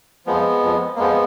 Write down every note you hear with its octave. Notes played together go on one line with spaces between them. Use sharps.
F2 F3 G#3 B3
F2 F3
A#3
F2 F3 G#3 B3